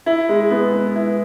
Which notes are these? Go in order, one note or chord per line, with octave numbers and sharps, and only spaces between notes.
E4
G#3
B3
B3
E4